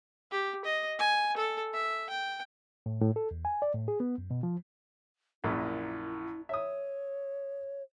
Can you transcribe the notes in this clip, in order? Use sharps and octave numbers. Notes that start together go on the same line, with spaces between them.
G4
D#5
G#5
A4
E5
G5
A2
A2
A4
E2
G#5
D5
A2
G#4
B3
F#2
B2
F3
A#1 F#2 A#2 E4
C#5 E5 D#6